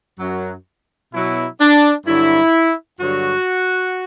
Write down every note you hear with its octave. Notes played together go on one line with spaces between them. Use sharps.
F#2 F#3
B2 F#3 E4
D4
G2 D3 F#3 E4
G2 D3 F#3 F#4